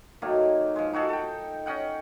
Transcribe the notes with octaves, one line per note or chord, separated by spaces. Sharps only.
D#3 F#3 A3 A#3
F3 G#3
D#4 F#4 G#4 A4
A4 G5
C#4 D#5 F#5 G5